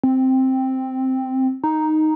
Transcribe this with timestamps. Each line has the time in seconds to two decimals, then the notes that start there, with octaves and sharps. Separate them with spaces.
0.04 C4
1.64 D#4